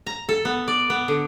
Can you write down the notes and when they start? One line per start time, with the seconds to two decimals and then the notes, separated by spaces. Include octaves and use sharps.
0.07 A#5
0.29 A4
0.45 B3
0.68 D5
0.90 B3
1.08 D3